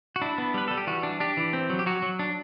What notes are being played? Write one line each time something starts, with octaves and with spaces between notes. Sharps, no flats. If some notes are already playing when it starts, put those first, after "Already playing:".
F#4
D4 E4
B3
G3 B4
G3 A4
G4
E3 F#4
D4
D4 G4
E3
C4
F#3
G4
F#3 F#4
F#3
D4